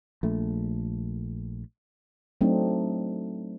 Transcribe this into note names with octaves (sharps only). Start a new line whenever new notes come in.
A#1 A3
F#3 A3 C4 D4 D#4